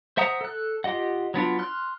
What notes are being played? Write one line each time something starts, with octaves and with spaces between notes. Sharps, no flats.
C5 E5 F#5 A#5 D#6
A4 F#6
F4 G4 D#5 F#5
F#3 B3 D4 F4
C6 F6 F#6